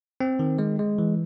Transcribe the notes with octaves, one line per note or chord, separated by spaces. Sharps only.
C4
D#3
G#3
G#3
E3